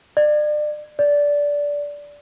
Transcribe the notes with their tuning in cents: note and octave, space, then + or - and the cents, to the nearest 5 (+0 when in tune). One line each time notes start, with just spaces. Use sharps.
D5 +35
D5 -15